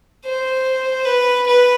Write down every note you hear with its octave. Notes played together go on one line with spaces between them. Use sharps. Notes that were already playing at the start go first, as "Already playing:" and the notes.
C5
B4
B4